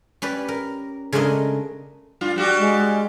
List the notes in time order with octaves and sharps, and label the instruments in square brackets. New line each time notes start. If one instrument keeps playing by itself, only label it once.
[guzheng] C#4 G4 B4 D5
A#4
C#3 G#3 A3 D4 A#4 D#5
[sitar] G2 F4
G3 F#4 G4
[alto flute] G#3